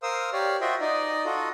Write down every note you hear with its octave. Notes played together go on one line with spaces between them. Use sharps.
A#4 C5 F5 D#6 E6
G4 C#5 D5 F5
F4 F#4 C5 D#5 E5 G5
D#4 D5 D#5
F4 F#4 A4 D#5